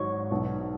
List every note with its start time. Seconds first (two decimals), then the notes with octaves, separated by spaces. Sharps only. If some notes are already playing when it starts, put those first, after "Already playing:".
Already playing: G#1 G#2 F#3 D#4 C#5
0.31 B1 B2 B3 D#4